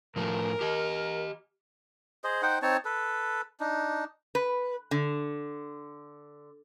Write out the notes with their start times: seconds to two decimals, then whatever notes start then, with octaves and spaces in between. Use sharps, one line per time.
0.16 A2 F3 A3 A#4
0.61 G4 D#5
2.24 G#4 C5 D#5
2.42 D#4 C5 F#5 G5
2.62 C4 D#4 C#5 A5
2.85 A4 B4
3.60 D4 D#4
4.35 B4
4.91 D3